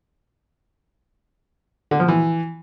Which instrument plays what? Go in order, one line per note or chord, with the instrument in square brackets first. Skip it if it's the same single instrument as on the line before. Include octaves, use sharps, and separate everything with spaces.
[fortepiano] D3
F3
E3